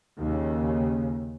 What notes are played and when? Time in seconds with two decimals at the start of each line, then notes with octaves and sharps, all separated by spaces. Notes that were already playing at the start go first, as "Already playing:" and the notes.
0.18 D#2 C#3